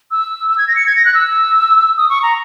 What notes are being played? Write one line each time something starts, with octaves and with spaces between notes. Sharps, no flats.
E6
E6
G#6
A#6
C#7
G#6
A#6
F#6
E6
D#6
C#6
A#5